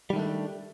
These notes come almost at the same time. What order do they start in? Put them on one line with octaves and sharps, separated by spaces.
G3 D#3 A3 D4